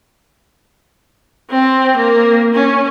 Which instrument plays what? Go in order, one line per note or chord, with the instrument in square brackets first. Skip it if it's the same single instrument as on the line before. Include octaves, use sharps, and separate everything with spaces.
[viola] C4
A#3
C#4